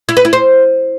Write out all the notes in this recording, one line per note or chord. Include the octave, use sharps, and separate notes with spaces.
E4
B4
E4
C5